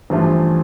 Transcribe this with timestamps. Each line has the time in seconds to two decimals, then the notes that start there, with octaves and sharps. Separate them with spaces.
0.10 A1 G2 E3 F3 A3